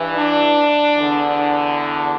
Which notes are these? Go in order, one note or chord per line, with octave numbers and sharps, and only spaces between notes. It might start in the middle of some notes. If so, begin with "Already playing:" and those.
Already playing: G2 E3
D4
E2 D3